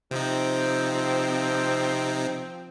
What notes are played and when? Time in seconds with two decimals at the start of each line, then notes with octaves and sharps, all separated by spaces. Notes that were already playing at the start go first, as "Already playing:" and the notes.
0.11 C3 F3 C4 D#4